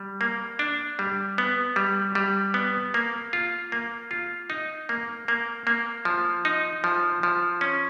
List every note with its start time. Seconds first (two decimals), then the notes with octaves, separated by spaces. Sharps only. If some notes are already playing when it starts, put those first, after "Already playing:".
Already playing: G3
0.21 A#3
0.59 D4
0.99 G3
1.38 B3
1.76 G3
2.15 G3
2.54 B3
2.94 A#3
3.33 F4
3.72 A#3
4.11 F4
4.50 D#4
4.89 A#3
5.28 A#3
5.67 A#3
6.05 F3
6.45 D#4
6.84 F3
7.23 F3
7.61 C#4